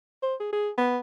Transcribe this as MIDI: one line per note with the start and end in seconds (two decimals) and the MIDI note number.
0.23 0.35 72
0.40 0.49 68
0.53 0.70 68
0.78 0.99 59